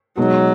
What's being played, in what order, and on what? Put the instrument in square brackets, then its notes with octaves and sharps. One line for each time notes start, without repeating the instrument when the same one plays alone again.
[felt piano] B2 G#3 D#4 [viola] F#3